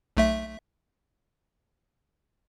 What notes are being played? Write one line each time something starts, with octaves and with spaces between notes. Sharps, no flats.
B1 A3 E5